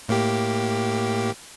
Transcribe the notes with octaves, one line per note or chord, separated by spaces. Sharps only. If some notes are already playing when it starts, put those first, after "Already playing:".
A2 A#3 G4